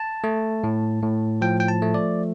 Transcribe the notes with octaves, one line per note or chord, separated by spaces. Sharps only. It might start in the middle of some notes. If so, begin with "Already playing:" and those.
Already playing: A5
A3
A2
A2
F3 G5
G5
A5
A3
D5